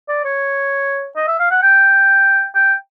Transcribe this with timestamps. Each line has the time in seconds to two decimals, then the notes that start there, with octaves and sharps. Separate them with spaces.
0.08 D5
0.24 C#5
1.16 D#5
1.28 E5
1.39 F5
1.51 F#5
1.63 G5
2.55 G5